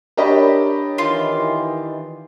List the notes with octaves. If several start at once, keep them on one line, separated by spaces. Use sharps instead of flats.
D4 G4 A#4 C#5 D#5 B5
D#3 E3 F4